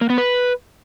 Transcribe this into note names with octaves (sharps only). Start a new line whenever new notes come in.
A#3
B3
B4